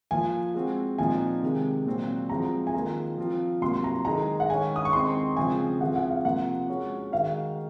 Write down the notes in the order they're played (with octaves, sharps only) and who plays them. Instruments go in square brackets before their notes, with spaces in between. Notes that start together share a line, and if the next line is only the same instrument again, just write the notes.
[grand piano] F3 A#3 F4 [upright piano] G#5
[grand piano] G#3 C4 F#4
[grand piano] A#2 F3 C4 D#4 [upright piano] G#5
[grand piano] C3 D#3 G#3
A#2 F#3 C4 F#4
[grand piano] F3 G#3 C4 F#4 [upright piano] A#5
[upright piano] G#5
[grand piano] D#3 A#3 F4 G#4 [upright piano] A#5
[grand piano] F3 C4 F4
[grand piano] C3 F#3 A#3 [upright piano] C6
[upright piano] A#5
[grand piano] D#3 G#3 D#4 G#4 [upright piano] A#5
[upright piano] F#5
[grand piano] D#3 G#3 C#4 [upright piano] G#5
[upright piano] D#6
C#6
[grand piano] D#3 G#3 C4 D#4 [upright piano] C6
[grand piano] C#3 F3 G#3 C4 [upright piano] G#5
[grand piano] F3 C4 F4 G#4 [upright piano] F#5
[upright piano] F#5
F5
[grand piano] C3 F3 A#3 F4 [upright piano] F#5
[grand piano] G#3 C#4 F#4
[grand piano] D#3 G#3 D#4 F#4 [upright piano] F5